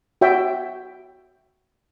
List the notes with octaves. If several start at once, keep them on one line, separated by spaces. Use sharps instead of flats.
F#4 C#5 E5 G5